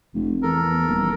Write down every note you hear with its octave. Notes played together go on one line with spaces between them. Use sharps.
F1
E2 A4 A#4
D#1